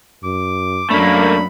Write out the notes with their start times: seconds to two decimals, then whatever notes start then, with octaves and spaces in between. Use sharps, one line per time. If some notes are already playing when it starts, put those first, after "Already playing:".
0.24 F#2 D6
0.90 F#2 A3 A#3 D4 B5